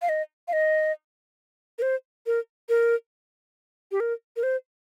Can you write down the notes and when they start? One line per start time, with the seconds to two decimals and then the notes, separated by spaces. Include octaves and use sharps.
0.02 F5
0.09 D#5
0.48 F5
0.53 D#5
1.78 A#4
1.82 C5
2.26 A#4
2.69 A#4
3.92 G4
4.00 A#4
4.36 A#4
4.43 C5